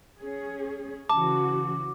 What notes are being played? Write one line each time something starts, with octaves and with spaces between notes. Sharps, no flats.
C#4 G#4
C#3 E3 F#4 A5 D6